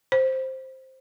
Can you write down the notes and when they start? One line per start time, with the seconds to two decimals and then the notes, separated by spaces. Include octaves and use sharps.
0.12 C5